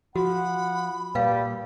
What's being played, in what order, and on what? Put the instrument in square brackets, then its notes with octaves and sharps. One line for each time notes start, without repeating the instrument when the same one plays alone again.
[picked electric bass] F3 [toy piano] F#4 [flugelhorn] F#5 [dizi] B5
[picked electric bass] A#2 [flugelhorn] G3 [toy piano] B4 F5